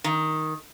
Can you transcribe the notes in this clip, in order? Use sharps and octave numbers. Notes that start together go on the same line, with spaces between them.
D#3